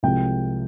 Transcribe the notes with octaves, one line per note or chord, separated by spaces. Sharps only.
C2 C3 F3 G#3 G5